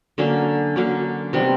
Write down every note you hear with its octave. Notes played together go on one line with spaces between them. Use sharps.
D3 F#3 A#3 C#4
D3 F#3 A#3 C#4
C3 D#3 G3 B3